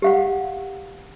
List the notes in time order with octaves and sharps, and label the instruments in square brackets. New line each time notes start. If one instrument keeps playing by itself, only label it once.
[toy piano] G4 F5 F#5